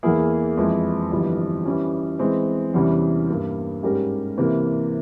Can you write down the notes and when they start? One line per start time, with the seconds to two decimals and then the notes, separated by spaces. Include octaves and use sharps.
0.03 E2 E3 A#3 E4 G#4
0.57 F2 E3 G#3 E4
1.12 G1 F2 E3 G3
1.65 E3 G3 C#4
2.19 E3 G#3 C4
2.74 E2 C3 E3 G3 C#4
3.29 G2 G3 A#3
3.83 G#2 G3 C#4 G4 A#4
4.37 C3 E3 A#3